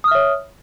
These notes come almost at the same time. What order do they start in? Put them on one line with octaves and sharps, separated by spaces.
D#6 F6 E5 C#5